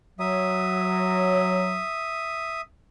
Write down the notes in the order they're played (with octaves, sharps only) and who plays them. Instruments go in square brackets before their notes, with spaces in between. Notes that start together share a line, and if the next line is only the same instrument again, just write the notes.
[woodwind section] F#3 [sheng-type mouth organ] E5 D#6